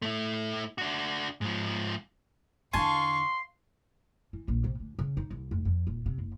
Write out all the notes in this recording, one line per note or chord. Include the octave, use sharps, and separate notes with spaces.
A3 E4
D4 F#4
G#2 F3
E2 D3 F5 G#5 A5 C6 C#6
E3
A#1
C3
D2
C#3
D#4
C2
F1
F2
D#1
C3
F#1